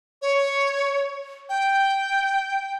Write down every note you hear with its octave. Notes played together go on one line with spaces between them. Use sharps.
C#5
G5